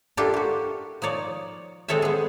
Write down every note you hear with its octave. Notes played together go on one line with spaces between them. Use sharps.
D4 E4 F4 G4 A4 A#4
F#4 G4
F3 D#4 C#5 D5
G#3 C4 A4 C#5 E5
B3 G#4